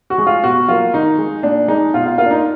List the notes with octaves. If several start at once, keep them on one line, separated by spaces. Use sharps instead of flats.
F#4
G#3
F4
B2 F#4
F#3 A#3 F4
D#3 D#4
G#3
A#2 D4
G#3 D#4
B2 F4
F4
A#3 F4
D4
D#4